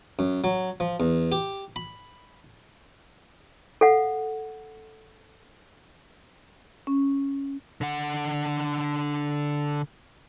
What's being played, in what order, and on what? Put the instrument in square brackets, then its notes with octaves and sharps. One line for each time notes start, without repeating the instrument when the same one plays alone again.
[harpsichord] F#2
F#3
F3
E2
G4
B5
[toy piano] A4 F5 F#5
[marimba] C#4
[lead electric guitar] D3 F#5